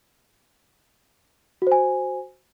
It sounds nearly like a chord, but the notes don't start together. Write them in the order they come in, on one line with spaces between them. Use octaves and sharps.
F#4 C5 G#5